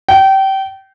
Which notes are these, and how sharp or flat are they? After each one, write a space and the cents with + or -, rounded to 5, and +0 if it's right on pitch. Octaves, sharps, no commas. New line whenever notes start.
G5 -25